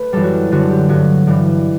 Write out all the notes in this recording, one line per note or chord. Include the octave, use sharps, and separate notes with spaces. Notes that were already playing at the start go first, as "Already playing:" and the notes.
Already playing: A3 B4
F#2 E3 G3 A4
F#4
F#2 D3 G3 F#4
G4
G2 F#3 A3 F#4
G2 E3 G3